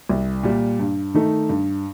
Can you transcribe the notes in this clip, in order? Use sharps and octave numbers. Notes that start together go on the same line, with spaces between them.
C2
A#2 G3
G2
D#3 A3 D#4
G2